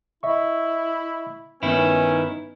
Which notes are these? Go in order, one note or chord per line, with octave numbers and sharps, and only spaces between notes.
E4 D#5 E5 C#6
G2 D#3 B3 C#4 D#4 E4 B4